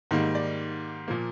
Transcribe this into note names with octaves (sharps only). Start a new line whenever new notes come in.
G#2 D#3 G3 A#3
D5
A#2 F3 A#3